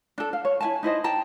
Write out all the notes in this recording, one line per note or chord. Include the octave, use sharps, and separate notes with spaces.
D4 A4
F5
C#5
E4 G#5 A5
D#4 E4 C5 D#5
G5 A5 A#5